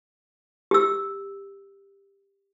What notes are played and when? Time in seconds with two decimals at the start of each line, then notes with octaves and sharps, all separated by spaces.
0.71 G4 E6